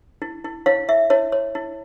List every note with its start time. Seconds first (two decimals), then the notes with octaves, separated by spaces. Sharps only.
0.22 E4
0.45 E4
0.66 E4 C#5 F5
0.89 E4 E5
1.10 E4 C#5
1.32 C#5
1.55 E4